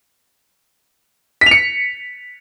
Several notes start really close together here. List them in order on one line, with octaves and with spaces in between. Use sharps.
B6 F7 C#7